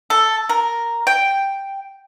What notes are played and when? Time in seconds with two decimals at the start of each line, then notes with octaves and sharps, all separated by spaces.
0.10 A4
0.49 A#4
1.07 G5